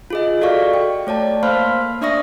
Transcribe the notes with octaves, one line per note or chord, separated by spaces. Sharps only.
F4 G#4 D#5
F#4 A4 D5 F5 C#6
G5
A3 C#5 D5 A5
A#3 C5 F5 B5 C6 F6
D4 D5 E5 C#6 D#6 A#6